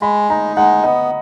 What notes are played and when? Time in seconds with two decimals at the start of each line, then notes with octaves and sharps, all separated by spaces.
0.01 G#3 B5
0.30 D#4 A#5
0.57 G#3 F#5
0.84 B3 D#5